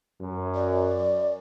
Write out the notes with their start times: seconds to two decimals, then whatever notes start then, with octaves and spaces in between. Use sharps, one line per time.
0.21 F#2
0.55 D5